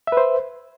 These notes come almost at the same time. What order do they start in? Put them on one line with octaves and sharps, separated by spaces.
E5 B4 C5